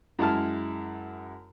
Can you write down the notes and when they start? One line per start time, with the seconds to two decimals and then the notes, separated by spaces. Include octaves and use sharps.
0.19 F#2 G#3 E4 A5 F6